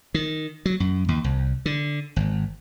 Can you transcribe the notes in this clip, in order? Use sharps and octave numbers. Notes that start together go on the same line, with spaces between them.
D#3
F#3
F#2
D#2
C2
D3
G#1